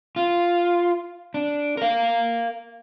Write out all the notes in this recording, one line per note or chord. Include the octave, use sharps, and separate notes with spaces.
F4
D4
A#4 F5